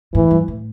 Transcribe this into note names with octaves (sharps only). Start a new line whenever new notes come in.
A2 E3
G2
A2